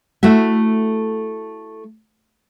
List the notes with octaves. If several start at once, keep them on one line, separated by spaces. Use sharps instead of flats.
A3 E4 F#4 E5